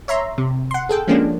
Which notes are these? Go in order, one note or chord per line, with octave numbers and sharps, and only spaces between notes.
C#5 E5 A#5 C6
C3
F#5 C6
G#4 A4 G5
F3 G#3 A#3 C#4 D4